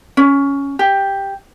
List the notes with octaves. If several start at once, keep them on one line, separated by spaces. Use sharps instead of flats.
C#4
G4